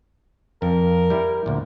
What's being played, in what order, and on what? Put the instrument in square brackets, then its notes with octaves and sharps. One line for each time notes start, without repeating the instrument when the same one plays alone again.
[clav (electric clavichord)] F2 [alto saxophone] A#4
[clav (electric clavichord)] G3 E4
D2 A#2